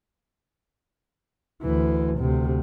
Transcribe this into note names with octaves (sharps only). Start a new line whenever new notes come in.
D2 E3
D2 C3